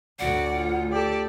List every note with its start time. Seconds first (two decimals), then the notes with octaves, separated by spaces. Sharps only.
0.19 D2 A2 D3 F#4 D5 F#5
0.55 F4
0.92 G4 A4 D5